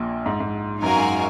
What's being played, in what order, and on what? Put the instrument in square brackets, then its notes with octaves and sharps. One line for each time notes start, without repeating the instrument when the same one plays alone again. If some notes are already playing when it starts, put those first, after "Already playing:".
Already playing: [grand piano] A#1 A#2
G#2
G#2
[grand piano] F#2 [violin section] D#4 F#4 A#4 F5 G#5
[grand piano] G#2